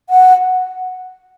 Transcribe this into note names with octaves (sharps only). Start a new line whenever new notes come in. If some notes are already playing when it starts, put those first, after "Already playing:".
F#5